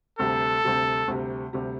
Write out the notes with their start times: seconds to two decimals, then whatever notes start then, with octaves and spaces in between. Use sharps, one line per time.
0.19 D2 C3 G3 A4
0.64 D2 C3 G3
1.08 D2 C3 G3
1.53 D2 C3 G3